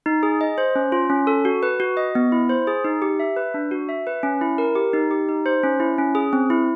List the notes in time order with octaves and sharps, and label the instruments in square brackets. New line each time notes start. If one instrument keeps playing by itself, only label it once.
[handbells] D#4
G#4
D#5
C5
C#4
F4
C#4
A4
F#4
B4
F#4
D#5
B3
E4
C5
G#4
D#4
G4
E5
B4
D4
F#4
E5
B4
C#4
E4
A#4
G4
D#4
G4
D#4
C5
C#4
E4
C#4
G#4
C4
E4